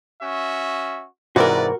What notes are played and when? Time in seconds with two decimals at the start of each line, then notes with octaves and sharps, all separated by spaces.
0.22 C#4 F#4 E5
1.36 G#2 C3 E3 F#4 A#4 B4 D5